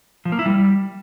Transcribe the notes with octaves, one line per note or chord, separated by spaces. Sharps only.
F3
A#3
E4
G3